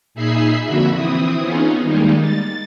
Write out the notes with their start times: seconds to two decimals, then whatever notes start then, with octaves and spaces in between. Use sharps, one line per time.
0.14 A#2 D#4 G#4 E5 B5 C7
0.65 F2 D3 A#3 F#4 E5 B5
0.95 E3 C4 E4 D#6
1.42 B3 C#4 D#4 F4 G#4
1.81 D#3 G3 G#3 A#3 D#4
2.21 A6